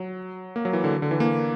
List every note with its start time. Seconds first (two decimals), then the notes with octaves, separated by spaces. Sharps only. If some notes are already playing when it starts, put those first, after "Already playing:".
Already playing: F#3
0.56 A#3
0.65 F#3
0.73 E3
0.84 D3
1.02 D3
1.11 E3
1.20 A#3